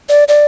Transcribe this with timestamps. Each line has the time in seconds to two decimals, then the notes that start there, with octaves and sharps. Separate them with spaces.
0.09 D5
0.28 D5